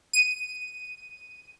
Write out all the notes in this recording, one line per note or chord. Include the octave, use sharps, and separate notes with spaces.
D#7